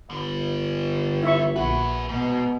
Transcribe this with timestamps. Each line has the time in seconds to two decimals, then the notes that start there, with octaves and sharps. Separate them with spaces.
0.11 G1 D3 G3
1.22 E4 E5 C#6
1.56 A#1 F#4 G#4 B4
2.09 G#2 B2